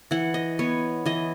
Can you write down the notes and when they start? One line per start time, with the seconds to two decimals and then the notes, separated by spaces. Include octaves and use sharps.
0.11 E3 F#5
0.34 D#5
0.59 B3 C#5
1.06 E3 D#5